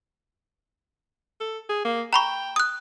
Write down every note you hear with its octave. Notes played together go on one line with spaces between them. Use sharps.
A4
G#4
A#3
G5 A#5 B5 C#6
D#6 F#6